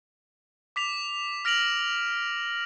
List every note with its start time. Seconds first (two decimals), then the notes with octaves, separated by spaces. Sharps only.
0.76 D6 B6 F7
1.45 F6 A#6 D7 F7 F#7